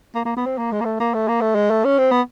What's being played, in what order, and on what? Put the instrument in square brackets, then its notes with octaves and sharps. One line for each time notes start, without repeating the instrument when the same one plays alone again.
[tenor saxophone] A#3
A#3
B3
C4
A#3
G#3
A#3
A3
A#3
A3
A#3
A3
G#3
A3
C#4
C4
B3